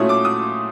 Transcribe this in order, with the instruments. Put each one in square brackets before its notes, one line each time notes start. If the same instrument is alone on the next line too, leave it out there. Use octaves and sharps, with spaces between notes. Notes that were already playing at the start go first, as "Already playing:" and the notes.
Already playing: [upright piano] A#2 F#3 A3 C#4 E4 D#6
D6
D#6